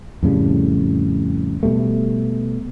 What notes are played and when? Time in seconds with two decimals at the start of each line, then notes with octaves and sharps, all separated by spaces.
0.23 F2 A2 C#3 G3
1.63 B2 G3 A3